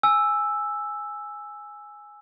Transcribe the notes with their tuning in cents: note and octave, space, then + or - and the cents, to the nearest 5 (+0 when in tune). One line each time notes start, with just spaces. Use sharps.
G#5 +0 E6 +0